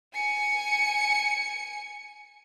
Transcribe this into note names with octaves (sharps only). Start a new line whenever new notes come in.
G#5 C#7